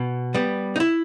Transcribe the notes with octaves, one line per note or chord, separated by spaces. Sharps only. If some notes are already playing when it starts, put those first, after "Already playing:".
Already playing: B2
G3 B3
D#4
E4